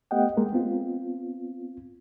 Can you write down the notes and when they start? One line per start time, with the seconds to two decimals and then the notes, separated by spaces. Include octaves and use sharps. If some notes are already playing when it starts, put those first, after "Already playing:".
0.11 A3 B3 G4 D#5 F#5 G5
0.37 G#3 A#3 A#4
0.53 B3 C4 F4